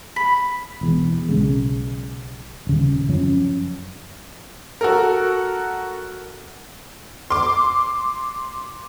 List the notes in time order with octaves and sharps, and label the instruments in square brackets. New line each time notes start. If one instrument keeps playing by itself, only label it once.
[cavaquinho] B5
[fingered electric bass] E1 E2
B1 C#3 G#3
D#1 C#3
F#2 F3 C#4
[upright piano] F#4 A4 A#4
[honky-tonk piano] C6 D6